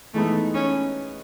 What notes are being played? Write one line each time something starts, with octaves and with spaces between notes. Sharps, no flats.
E3 G#3 A3 B3 D#4
C#4